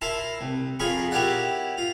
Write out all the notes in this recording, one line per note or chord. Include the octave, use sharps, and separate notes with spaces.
E4 A#4 A5 C6
C2
F2 F4 G#4 A#4 B5 C#6
E4 G4 A#4 C#5 D5 F#5
F4